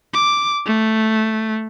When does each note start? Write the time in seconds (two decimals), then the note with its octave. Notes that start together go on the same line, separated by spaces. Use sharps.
0.14 D6
0.66 A3